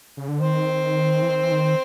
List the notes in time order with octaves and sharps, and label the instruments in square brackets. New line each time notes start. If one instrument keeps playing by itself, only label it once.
[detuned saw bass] C#3
D3
[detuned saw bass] D#3 [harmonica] C4 C5
[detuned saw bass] E3
D#3
E3
D#3